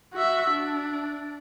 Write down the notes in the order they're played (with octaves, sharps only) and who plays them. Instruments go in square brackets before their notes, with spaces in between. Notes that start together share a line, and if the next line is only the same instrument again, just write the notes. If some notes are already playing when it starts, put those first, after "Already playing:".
[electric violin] F#4 E5
D4